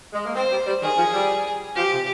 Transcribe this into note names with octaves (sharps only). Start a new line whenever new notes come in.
G#3
A#3
C4 C5
G3
G3
D#3 G#4
F3
G3
F3 G4
C3